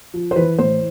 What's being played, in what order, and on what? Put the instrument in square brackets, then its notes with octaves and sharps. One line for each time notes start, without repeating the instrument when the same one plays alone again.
[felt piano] F3
C5
E3 B4
A2 C5